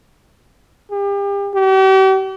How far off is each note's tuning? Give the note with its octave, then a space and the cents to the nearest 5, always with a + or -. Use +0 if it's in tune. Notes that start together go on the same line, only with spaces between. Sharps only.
G4 +35
G4 -40